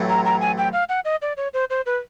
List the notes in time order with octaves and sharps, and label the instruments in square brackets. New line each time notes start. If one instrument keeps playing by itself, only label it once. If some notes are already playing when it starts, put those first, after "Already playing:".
Already playing: [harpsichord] A1 A2 F#3 A3 C4
[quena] A#5
A#5
G#5
G5
F5
F#5
D#5
D5
C#5
C5
C5
B4